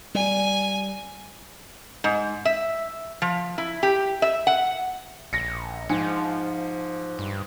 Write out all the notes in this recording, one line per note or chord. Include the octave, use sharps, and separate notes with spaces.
G3 G#5
G#2
E5
F3
E4
G4
E5
F#5
A#1 A#6 C#7
G#2 F3 G#5 C#7
G2